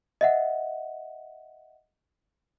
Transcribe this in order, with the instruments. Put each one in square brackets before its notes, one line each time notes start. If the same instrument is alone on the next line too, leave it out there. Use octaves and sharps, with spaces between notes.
[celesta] D#5 E5 F#5